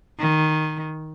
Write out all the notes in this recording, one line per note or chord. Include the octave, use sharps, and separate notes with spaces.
D#3